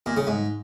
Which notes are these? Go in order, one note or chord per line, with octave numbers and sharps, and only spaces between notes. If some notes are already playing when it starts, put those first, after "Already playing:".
A#2
C#3
G#2